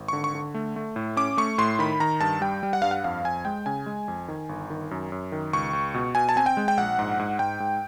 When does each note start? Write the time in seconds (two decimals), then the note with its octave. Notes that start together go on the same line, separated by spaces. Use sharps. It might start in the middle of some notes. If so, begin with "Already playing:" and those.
Already playing: G#1
0.08 D3 C#6
0.24 C#6
0.35 D3
0.54 A3
0.76 A3
0.96 A2
1.17 C#4 D6
1.37 A3 C#6
1.58 A2 C6
1.79 D#3 B5
2.00 D#3 A#5
2.21 G2 A5
2.41 G3 G5
2.63 G3
2.73 F#5
2.82 G2 F5
2.91 F#5
3.04 F2 F5
3.24 F2 G#5
3.45 G#3 G5
3.66 C#3 G#5
3.86 G#3
4.08 F2
4.28 D#3
4.49 G1
4.70 D#3
4.91 F#2
5.12 F#2
5.32 D#3
5.53 C#2 C#6
5.73 C#2
5.94 B2
6.15 B2 G#5
6.29 A5
6.36 C4 G#5
6.46 G5
6.57 G#3
6.68 G5
6.77 A#1 F#5
6.99 G#2
7.19 G#2
7.39 G#2 G5
7.60 G#2